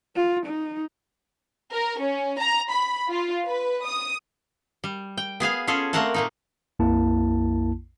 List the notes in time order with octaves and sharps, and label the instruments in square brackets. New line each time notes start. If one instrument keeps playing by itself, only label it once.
[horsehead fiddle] F4
D#4
[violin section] A#4
C#4
A#5
B5
F4
B4
D#6
[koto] G3
G5
B3 G#4 F5 G#5
C#4 F4 G#4 A4
A3 A#3 C4 A#4 F#5 A5
A#2 A#3 D#4
[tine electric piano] A#1 F2 A#3 E4 A5